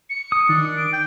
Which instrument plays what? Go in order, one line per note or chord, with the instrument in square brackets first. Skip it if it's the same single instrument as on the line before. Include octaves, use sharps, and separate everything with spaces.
[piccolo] C#7
[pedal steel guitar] D#6
[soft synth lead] D#3 [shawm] D4
[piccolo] D7
[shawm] G5